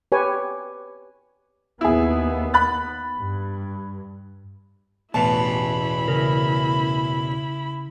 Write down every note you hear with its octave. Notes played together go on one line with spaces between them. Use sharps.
G4 B4 C#5 G#5
D#2 B3 E4 G#4
B5 F#6 A6
G2
A1 E2 B2 E4 A5 B5
C#3 A#4